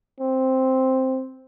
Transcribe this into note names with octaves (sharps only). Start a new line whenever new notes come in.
C4